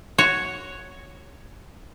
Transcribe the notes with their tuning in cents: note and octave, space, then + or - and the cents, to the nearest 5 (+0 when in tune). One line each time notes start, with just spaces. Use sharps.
F#4 +0 C#5 +0